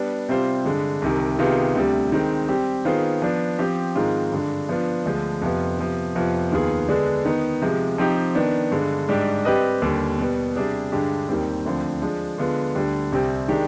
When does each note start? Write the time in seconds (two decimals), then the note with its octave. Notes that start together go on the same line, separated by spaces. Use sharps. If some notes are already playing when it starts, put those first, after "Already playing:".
Already playing: G3 B3 D4
0.28 C3 G3 C4 F4 C5
0.65 G2 D3 G#3
1.02 C2 C3 D#3
1.39 C3 D#3 B3 F4 G#4
1.75 D2 C3 G3
2.12 D#3 G#3 C4
2.48 G3 C4 G4
2.85 D#3 B3 F4 G#4 C5
3.22 F3 B3 D4
3.58 F3 C4 G4
3.95 G#2 D#3 G#3 C4 F4
4.32 G2 D3 G#3
4.69 F3 B3 D4 F4
5.05 D2 D3 F3 G#3
5.41 F2 C3 F3 B3 F4
5.78 C3 F3 B3
6.15 F2 C3 F3 B3 F4
6.52 D#2 D#3 B3 F4 G#4
6.88 D3 G#3 B3 D4 G#4
7.25 D#3 B3 D#4
7.62 C3 F3 G#3
7.98 F3 C4 D#4 G4
8.35 D#3 B3 D4
8.71 G2 D3 G#3
9.09 G#2 G3 D4 G4
9.45 G3 C4 G4 B4 D#5
9.82 D#2 D3 G3
10.18 B2 G3 B3
10.55 C3 G3 D4 G#4
10.92 G2 D3 G#3 D4 G4
11.29 D#2 D#3 G3 C4
11.66 D2 D3 F3 C4
12.02 F3 G#3 D4
12.38 D3 G#3 B3 F4
12.75 D2 D3 G3
13.12 C2 C3 G3 C4
13.48 D#3 G#3 D4 G4